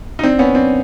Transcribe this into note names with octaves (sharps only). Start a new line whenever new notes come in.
D#4
C4 D4
B3 C#4
C4 D4